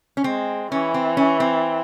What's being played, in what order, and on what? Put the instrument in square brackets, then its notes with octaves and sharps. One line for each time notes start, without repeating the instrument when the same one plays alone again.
[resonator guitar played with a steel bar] C#4
[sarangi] G#3 [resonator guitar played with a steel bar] C4
[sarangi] E3 [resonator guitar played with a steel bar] C#4
[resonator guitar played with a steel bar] C4
C#4
C4